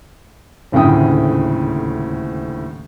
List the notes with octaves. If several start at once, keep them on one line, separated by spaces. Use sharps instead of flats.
D#1 D2 A2 C#3 G5 D#6